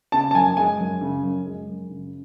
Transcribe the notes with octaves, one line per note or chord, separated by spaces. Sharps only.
C#3 A5
A5
F#2 G#5
G#3 G#5
F#2
C#3
F#2
G#3
F#2
C#3